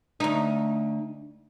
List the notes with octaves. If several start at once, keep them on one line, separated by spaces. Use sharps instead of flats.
D2 D#4